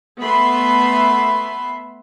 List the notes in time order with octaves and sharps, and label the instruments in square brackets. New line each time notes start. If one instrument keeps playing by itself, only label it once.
[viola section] A3 B3 B4 E5 B5 C6